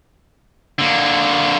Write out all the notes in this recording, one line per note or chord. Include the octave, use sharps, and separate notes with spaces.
D3 A#3